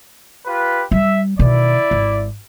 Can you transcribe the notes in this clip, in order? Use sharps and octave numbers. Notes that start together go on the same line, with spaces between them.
F4 G4 B4
G3 E5
B2 D#3 E4 D5
G#1